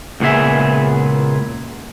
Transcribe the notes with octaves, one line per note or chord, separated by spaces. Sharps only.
C#2 A#2 B3 G#4 E5